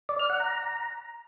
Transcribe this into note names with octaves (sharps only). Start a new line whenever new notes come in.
D5
F6
F#5
A#5